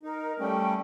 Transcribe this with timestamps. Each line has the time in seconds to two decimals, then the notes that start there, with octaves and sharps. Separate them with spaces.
0.03 D#4 A#4
0.39 G3 A3 C#4 G5